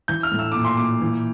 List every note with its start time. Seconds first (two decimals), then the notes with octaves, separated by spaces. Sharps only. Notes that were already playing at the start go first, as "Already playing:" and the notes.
0.08 E3 G6
0.23 F6
0.32 A2
0.39 E6
0.52 A#2 D6
0.65 C6
0.77 A#2 D6
1.01 E3